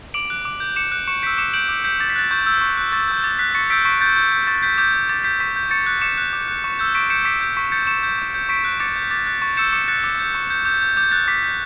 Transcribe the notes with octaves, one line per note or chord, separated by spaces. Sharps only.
D6 D7 F#7
F#6
D6
G6
D6 C#7 E7
F#6
C#6 C#7 E7
E6 G6 B6 D7
D6 C#7 E7
G6 D7 F#7
D6
G6 B6
D6 A6
B6
F#6 A6
C#6 G6
E6 G6
C#6
F#6
C#6 A6
G6
E6
D6 A6
F#6 B6
C#6 A6 C#7
E6 G6 B6 D7
C#6 B6 D7
G6 A6
C#6 G6
G6
C#6 A6
G6 B6
D6 G6
G6
D6 A6
G6 B6
C#6 B6
G6
C#6 A6 C#7
F#6
D6 C#7 E7
F#6
D6
F#6
C#6
E6 G6
C#6 B6 D7
G6 C#7 E7
D6 B6 D7
G6
C#6 B6
G6 A6 C#7
C#6 C#7 E7
G6
D6
G6
C#6 B6 D7
F#6
D6 A6 C#7
G6
D6 A6
F#6 A6
C#6 A6
E6 G6 C#7 E7
D6 C#7 E7
F#6 A6 C#7
D6
G6
C#6
G6
D6 G6
G6
D6 G6
F#6 A6
D6 B6
G6